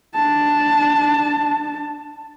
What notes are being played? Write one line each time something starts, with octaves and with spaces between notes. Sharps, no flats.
D4 A5